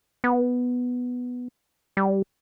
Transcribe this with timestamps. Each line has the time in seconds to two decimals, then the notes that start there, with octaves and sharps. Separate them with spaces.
0.24 B3
1.97 G3